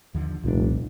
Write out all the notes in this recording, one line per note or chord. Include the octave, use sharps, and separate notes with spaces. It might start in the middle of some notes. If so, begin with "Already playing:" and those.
D#2 D3 F3
F1 C2 A#2 D4